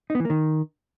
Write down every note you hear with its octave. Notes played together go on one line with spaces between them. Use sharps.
D#4
B3
E3
A#3
D#3